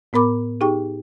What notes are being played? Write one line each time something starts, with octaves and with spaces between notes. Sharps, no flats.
A2 B3 A#4 B5 D6
D#4 G4 G#4 G5 C#6